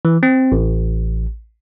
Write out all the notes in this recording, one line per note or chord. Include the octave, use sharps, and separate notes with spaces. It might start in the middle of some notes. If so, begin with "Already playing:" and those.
E3
C4
A1